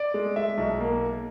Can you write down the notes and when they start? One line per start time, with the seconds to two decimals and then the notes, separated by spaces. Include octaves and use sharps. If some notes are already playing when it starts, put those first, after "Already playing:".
Already playing: D5
0.14 G#3
0.36 G#3 E5
0.58 B1
0.80 A#3